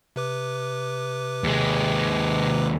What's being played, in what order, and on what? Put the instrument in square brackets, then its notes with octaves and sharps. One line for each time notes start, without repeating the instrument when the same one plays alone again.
[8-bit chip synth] C3 B4 D6
[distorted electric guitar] D#2 G#3